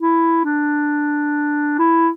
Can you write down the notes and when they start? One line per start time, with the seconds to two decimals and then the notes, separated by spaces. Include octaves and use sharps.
0.01 E4
0.44 D4
1.79 E4